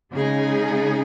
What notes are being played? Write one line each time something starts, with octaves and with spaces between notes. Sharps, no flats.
C#3 G#3 D#4 G#4